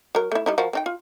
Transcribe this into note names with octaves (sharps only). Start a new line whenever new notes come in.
F#3 A#4
A3 E4
G3 D#4 E4
F3 F#4 A#4
C4 D#4 G5
F4